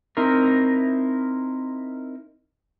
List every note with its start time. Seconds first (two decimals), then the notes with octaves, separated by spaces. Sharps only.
0.17 C4 D#4 E4 A#4